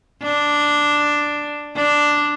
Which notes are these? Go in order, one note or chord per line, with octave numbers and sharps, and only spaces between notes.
D4
D4